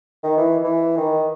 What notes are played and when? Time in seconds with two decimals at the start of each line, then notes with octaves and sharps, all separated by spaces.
0.24 D#3
0.38 E3
0.64 E3
0.97 D#3